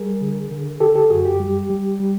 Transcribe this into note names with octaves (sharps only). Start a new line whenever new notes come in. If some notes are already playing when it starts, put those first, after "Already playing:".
Already playing: G3 G#4 A#4
D3
D3
D3 G4 A4
G4 A4
F#2 F#4 G#4
G4
G3
G3
G3